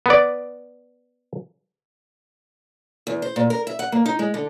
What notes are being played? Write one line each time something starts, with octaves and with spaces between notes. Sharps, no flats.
B3 D5
E2
C5
A#2
A#4
E5
F#5
A#3
D#4
G#3
D3